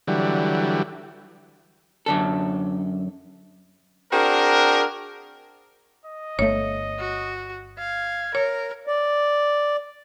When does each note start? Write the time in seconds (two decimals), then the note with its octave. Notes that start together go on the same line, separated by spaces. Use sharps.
0.07 D3 E3 F#3 G3
2.06 F#2 D3 A4
4.11 C4 D4 F#4 G#4 A#4
6.06 D#5
6.39 G1 A3 C#5
6.99 F#4
7.79 F5 G#6
8.35 A#4 C#5
8.87 D5